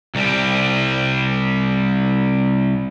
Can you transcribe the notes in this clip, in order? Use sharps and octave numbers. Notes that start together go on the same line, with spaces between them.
C2 G3